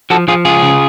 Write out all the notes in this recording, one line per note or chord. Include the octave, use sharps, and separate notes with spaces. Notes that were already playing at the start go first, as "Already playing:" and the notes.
F3 F#4 A4
F3 F4 G#4
C#2 F4 G#4
C#3